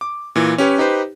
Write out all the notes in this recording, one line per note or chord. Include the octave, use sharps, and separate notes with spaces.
D6
A#2 E3
C#4 G4 B4 C#5
D#4 G4 B4 C5